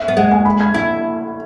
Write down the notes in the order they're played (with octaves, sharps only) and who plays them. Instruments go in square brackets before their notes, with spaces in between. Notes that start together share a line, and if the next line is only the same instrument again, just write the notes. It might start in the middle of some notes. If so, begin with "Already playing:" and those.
Already playing: [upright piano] E5
[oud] B3
[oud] G#3 [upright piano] F#5
[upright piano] G#5
B5
G#6
[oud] E4 [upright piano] G#6